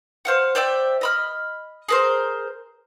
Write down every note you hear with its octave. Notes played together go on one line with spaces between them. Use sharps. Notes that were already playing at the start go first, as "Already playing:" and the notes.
C5 F5 F#5
C5 D5 E5 G5
D#5 B5 F6
G#4 A#4 C5